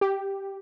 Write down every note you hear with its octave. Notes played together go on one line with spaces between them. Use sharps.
G4